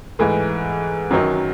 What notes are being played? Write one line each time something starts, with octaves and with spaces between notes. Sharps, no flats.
G#2 E3 A3
F#2 D#3 F#3